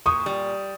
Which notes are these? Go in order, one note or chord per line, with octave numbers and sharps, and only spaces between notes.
A#2 C#6 D#6
G3